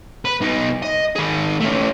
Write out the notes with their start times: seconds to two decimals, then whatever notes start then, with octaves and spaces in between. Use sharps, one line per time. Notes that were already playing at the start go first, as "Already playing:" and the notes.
0.25 B4
0.42 B2 D#4
0.83 D#5
1.16 D#3 G#4
1.60 A3 C#4